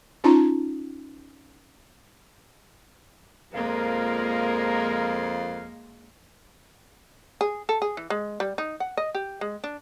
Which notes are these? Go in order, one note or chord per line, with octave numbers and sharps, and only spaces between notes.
C#4 D#4 F4 A5 A#5
F2 A#2 F3 G#3 A#3 A#4 F5
G#4
A4
G#4
E3
G#3
G3
D#4
F#5
D#5
G4
G#3
D4